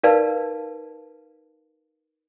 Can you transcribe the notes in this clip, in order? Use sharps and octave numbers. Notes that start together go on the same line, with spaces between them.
D#4 A#4 B4 D5 F5 A5